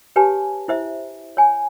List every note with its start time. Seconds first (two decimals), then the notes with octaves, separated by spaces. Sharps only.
0.16 G4 B4 C#5 G#5 A5
0.68 E4 C5 E5
1.37 C#5 G#5